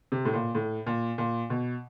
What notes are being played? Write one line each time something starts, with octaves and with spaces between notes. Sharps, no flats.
C3
A2
A#2
A2
A#2
A#2
B2